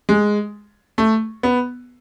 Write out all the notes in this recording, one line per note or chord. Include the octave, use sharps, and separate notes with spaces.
G#3
A3
B3